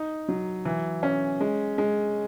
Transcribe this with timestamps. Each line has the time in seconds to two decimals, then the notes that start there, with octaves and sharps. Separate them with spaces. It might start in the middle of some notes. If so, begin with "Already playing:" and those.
Already playing: D#4
0.29 F#3
0.65 E3
1.03 C#4
1.41 G#3
1.78 G#3